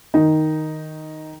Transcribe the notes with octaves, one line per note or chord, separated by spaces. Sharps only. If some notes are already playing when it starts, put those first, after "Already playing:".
D#3 D#4